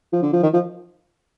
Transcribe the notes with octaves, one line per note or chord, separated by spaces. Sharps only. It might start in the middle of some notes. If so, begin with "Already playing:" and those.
F3
D3
F3
D#3
F3